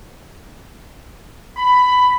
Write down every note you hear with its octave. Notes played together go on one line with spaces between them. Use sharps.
B5